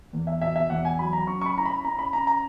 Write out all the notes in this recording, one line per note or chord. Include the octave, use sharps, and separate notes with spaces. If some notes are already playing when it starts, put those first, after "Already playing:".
E2
E5
B2 E5
E5
E2 F#5
G#5
F#3 B5
A#5
C#4 C#6
C#6
B5
E4 A#5
B5
C#4 A#5
B5
C#4 A#5
A#5